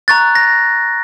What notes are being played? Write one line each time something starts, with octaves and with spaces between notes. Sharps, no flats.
A#5 C#6 F#6 A6
A#6